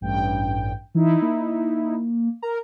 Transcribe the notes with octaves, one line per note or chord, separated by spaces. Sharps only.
A1 G2 G5
E3 D#4 E4
A#3
A#4 A#5